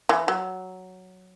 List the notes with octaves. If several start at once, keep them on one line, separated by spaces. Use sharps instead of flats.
E3
F#3